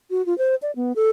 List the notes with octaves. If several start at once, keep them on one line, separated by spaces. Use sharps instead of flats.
F#4
F4
C5
D5
B3
A4